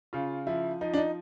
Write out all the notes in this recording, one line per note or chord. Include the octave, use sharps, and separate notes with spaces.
C#3 F4
F3 E4
F3 D#4
D4
D#4